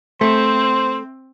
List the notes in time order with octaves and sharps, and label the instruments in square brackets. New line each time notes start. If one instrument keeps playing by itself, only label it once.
[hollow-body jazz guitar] A3 [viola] C4 [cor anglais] C5